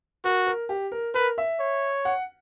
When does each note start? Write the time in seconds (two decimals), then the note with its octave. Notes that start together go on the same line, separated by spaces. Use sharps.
0.24 F#4 A#4
0.47 A#4
0.69 G4
0.92 A#4
1.14 A#4 B4
1.38 E5
1.60 C#5
2.05 F#5